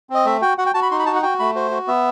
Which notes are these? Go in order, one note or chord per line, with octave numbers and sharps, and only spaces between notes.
C4 D#5
A3 E5
F#4 G5
F#4 F#5
G5
F#4 A5
B5
D#4 C6
B5
F#4 A5
F#5
F#4 G5
A3 B5
F#4 C5
F#4
B3 E5